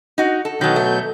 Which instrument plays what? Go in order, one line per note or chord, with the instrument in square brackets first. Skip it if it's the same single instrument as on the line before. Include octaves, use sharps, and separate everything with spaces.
[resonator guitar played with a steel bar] D#4 F#4
A4
[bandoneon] B2 F#3 G6 [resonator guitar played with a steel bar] D#3 B3
[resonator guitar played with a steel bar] A3